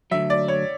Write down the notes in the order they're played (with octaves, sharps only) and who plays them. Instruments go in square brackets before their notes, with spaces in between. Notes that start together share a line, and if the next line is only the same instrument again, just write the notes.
[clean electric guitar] D2 D3 F#3 [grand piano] E5
[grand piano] D5
C#5